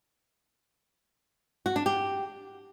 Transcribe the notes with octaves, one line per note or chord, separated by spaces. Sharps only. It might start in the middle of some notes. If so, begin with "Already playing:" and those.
F#4
D4
G4